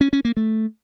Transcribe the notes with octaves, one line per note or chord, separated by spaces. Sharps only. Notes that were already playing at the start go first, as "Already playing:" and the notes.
C#4
C#4
A#3
A3